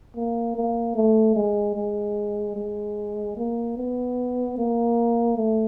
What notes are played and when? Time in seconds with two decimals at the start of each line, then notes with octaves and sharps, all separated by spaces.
0.16 A#3
0.56 A#3
0.96 A3
1.36 G#3
1.76 G#3
2.56 G#3
3.37 A#3
3.77 B3
4.58 A#3
5.37 A3